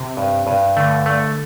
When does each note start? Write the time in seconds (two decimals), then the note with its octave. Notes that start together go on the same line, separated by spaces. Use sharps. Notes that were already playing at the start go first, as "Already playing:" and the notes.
Already playing: C3
0.17 G2
0.47 G2
0.77 D3 A3
1.06 A3